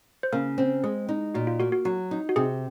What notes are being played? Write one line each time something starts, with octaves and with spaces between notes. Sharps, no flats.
C5
C#3 A#3 A#4
C4
G#3 G#4
D#4
A#2 F#4
F4
A#3 F#4
F#4
F#3 F#4
D#4
F#4
C3 G#4